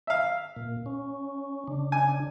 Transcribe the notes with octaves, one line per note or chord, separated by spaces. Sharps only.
E5 F5
A#2
C#4
C#3 D4
G#5